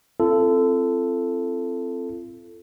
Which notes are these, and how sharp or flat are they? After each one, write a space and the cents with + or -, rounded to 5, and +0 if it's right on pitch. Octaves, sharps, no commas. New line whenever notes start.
C4 +0 F4 -40 A4 +0